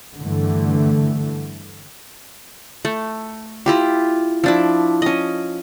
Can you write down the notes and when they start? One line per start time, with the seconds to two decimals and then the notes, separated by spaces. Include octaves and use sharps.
0.19 G2 D3 E3 A3
2.85 A3
3.66 E4 F4 G4
4.44 F3 D4 E4
5.02 C#4 D#5